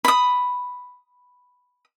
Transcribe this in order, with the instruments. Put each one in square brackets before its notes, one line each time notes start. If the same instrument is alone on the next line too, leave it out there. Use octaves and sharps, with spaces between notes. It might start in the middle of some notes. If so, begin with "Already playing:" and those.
[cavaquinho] B5 D#6